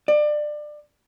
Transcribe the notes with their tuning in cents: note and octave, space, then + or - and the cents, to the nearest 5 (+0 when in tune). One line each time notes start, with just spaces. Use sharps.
D5 +25